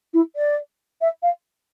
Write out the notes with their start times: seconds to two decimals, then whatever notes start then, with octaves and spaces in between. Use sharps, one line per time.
0.14 E4
0.36 D5
1.01 E5
1.23 F5